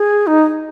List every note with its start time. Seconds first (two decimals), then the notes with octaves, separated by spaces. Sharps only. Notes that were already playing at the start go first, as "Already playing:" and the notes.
Already playing: G#4
0.27 D#4